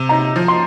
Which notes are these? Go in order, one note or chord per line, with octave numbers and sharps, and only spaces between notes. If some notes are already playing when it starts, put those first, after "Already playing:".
Already playing: C3
D#4 A#5
F3
C6